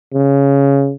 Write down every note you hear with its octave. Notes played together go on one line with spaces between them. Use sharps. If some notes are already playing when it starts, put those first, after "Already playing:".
C#3